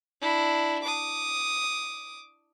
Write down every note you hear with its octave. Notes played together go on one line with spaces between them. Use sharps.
D4 E4
D6 D#6